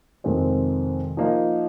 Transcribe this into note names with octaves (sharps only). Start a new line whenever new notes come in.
F2 C3 D#3 G#3 C4
F3 A#3 D#4